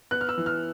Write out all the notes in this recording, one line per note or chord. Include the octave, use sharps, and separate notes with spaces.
B3 F#6
F6
E6
E3
F6